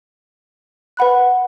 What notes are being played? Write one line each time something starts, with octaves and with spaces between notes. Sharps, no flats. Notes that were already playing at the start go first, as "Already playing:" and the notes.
B4 F#5 B5 F#6